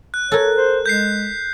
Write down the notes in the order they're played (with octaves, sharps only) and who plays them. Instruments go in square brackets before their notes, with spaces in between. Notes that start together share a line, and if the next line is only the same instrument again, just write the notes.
[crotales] F#6
[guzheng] A4 A#4 [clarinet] C#5
[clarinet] C5
[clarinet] G#3 [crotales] G6 B6 C7